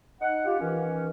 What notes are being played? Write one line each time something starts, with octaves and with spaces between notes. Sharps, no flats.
D#4 F#5
F4 G4
D#3 E3 C#4